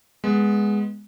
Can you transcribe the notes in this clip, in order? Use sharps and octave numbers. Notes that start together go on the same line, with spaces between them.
G#3 B3